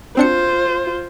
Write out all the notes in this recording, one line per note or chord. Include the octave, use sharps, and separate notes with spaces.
C4 D4 F4 C5 C#7